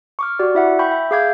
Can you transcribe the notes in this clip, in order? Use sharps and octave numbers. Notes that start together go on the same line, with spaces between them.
C#6 D6 F6
F#4 G4 D5
E4 E5 F#5
G5 B5 C#6 G6
E5
G#4 E5 F5 D6 G6 G#6